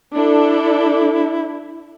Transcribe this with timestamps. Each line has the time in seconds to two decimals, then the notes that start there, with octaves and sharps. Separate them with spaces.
0.14 D4 E4 A4